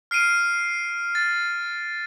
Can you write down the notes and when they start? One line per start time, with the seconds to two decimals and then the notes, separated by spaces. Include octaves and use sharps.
0.11 F6 C7 D7 D#7
1.15 A6